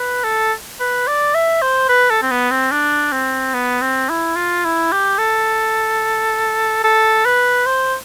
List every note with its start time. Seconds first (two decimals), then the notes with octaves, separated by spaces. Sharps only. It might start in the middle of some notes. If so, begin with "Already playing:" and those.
Already playing: B4
0.24 A4
0.80 B4
1.07 D5
1.34 E5
1.62 C5
1.89 B4
2.10 A4
2.22 C4
2.31 B3
2.51 C4
2.72 D4
3.12 C4
3.54 B3
3.81 C4
4.09 E4
4.36 F4
4.65 E4
4.92 G4
5.18 A4
6.84 A4
7.25 B4
7.66 C5